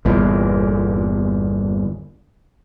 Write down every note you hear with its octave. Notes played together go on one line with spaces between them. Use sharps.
G1 E2 A#2